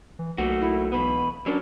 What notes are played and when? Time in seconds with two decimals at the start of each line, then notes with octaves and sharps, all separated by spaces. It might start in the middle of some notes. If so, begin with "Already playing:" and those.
0.19 E3
0.38 B1 A3 A#3 F#4
0.61 E4
0.92 E2 B2 B3 B5
1.46 F#3 C#4 D4 A#4